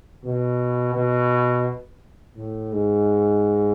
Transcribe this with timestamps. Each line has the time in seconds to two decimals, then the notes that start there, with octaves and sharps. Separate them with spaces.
0.25 B2
0.95 B2
2.37 A2
2.72 G#2